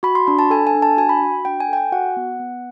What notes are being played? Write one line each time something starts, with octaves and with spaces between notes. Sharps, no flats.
F#4 B5
C6
D4 B5
A5
A4 G#5
G#5
D4
A5
F#4 G#5
B5
F#4
D4 G5
G#5
A4 G5
G#5
F#4 F#5
B3
B3